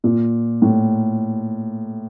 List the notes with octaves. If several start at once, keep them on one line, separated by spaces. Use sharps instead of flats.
A#2
A2